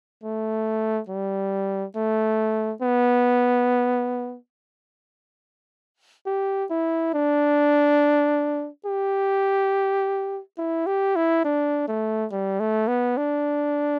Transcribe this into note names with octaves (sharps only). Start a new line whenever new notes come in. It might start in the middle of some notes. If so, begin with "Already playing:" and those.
A3
G3
A3
B3
G4
E4
D4
G4
E4
G4
E4
D4
A3
G3
A3
B3
D4